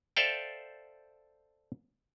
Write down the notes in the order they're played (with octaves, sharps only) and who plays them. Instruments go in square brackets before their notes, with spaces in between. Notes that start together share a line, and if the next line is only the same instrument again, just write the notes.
[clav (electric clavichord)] A4 C5 D5 E5 F5 G5